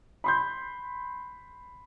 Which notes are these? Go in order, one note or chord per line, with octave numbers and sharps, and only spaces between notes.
B5 C6 G6